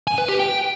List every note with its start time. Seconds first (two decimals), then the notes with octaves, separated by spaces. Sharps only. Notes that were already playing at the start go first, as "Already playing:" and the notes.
0.07 G#5
0.18 B4
0.29 G4
0.40 G5